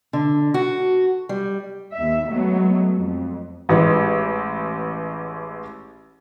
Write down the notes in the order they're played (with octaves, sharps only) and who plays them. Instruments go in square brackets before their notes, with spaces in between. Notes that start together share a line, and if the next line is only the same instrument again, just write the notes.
[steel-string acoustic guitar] D3
F#4
G3
[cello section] D#2 E5
F#3 G#3 A3 B3
F2
[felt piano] A1 E3 G#3